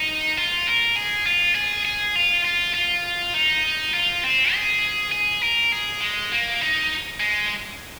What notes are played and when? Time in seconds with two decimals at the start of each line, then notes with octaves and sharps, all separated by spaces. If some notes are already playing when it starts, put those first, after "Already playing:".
Already playing: D#4
0.37 F4
0.67 A#4
0.96 G#4
1.26 F4
1.55 G#4
1.85 G#4
2.16 F4
2.45 F4
2.74 F4
3.34 D#4
3.94 F4
4.24 C4
4.53 G#4
5.12 G#4
5.42 A#4
5.72 G#4
6.01 G#3
6.32 A#3
6.61 D#4
7.20 G#3